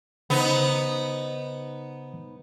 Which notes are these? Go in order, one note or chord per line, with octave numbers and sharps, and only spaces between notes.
C#3 B3 D#4 C5